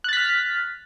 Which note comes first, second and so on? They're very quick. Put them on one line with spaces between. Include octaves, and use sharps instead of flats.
F#6 A6 B6 F6